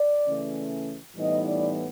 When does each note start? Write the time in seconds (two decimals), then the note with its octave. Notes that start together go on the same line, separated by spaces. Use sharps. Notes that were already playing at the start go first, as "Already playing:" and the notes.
Already playing: D5
0.27 C#3 E3 A3 C#4
1.16 A2 E3 G3 B3 D#4 D#5
1.46 D5